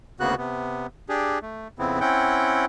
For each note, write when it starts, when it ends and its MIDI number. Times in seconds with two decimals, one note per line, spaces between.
0.20 0.35 38
0.20 0.35 49
0.20 0.35 58
0.20 0.35 59
0.20 0.35 66
0.20 0.35 90
0.38 0.87 48
0.38 0.87 59
1.09 1.39 62
1.09 1.39 67
1.09 1.39 68
1.42 1.68 57
1.79 2.00 41
1.79 2.00 49
1.79 2.00 59
1.79 2.00 60
1.79 2.00 64
2.01 2.65 60
2.01 2.65 61
2.01 2.65 64
2.01 2.65 78
2.01 2.65 79